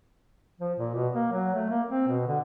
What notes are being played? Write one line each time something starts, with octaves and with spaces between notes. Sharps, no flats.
F3
A#2
B2
A#3
F#3
A3
A#3
C4
B2
D3